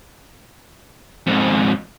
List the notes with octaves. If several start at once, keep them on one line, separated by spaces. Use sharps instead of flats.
F2 G#2